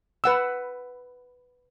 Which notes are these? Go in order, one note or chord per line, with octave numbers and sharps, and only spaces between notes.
B4 F#5 E6